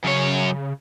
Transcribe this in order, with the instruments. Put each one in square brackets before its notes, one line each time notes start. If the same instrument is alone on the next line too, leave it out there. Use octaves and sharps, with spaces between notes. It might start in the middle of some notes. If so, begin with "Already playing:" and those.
[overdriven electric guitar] F#2 C#5 [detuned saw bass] C#3